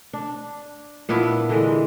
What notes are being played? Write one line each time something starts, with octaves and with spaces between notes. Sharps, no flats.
D4
A#2 B3 D4 E4
D3 E3 G#3